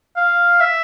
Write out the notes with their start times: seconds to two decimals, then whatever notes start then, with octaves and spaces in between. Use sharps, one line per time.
0.17 F5
0.60 E5